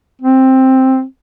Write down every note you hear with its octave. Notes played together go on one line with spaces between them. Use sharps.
C4